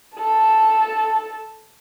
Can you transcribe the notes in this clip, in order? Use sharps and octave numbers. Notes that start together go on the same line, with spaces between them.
A4 A5